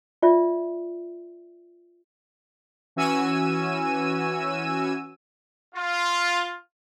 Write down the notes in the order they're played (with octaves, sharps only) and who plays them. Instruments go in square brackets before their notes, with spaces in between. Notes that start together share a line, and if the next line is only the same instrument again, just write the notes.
[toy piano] F4 D5 E5
[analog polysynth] E3 C#4 F#4 G#5 E6 D#7
[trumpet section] F4